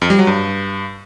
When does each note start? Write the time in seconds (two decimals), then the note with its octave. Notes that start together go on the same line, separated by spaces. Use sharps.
0.02 F2
0.10 G3
0.19 F#3
0.27 G2